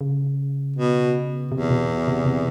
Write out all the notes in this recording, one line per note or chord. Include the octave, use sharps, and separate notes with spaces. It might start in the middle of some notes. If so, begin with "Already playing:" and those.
C#3
B2
E2 C3
B2
C3
C3